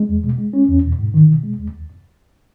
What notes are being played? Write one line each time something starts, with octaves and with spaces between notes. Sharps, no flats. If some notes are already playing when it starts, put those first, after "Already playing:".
Already playing: G#3
E2
B2
G#3
C#4
E2
B2
G#2
D#3
B2
G#3
D#2